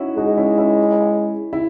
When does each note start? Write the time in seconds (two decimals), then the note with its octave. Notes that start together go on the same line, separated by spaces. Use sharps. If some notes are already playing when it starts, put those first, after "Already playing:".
Already playing: C#4 D#4 E4 F#4
0.17 G#3 D#4 F#4
0.37 C#4 E4
0.58 C#4 E4
1.53 E4